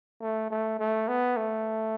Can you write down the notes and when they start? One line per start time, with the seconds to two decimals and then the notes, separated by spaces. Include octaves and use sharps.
0.21 A3
0.51 A3
0.80 A3
1.08 B3
1.37 A3